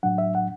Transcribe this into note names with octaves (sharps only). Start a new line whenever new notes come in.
A2 F#3 D4 F#5
E5
F#5